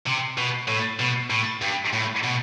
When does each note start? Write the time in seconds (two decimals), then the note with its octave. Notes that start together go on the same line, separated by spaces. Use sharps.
0.06 C3
0.38 B2
0.68 A2
0.99 B2
1.30 A2
1.62 G2
1.93 A2
2.23 B2